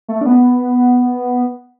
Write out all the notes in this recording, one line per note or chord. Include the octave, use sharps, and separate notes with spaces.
A3
D4
B3